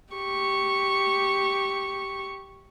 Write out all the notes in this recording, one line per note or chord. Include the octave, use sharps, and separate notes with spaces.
G4 C#6